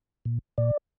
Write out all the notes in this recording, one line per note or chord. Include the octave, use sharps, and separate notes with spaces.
A#2
A#2 D5